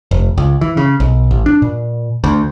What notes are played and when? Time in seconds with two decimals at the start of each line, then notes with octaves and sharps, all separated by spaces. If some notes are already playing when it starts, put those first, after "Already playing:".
0.11 F1
0.38 C#2
0.61 E3
0.77 C#3
1.00 B1
1.31 A1
1.46 D4
1.62 A#2
2.24 D2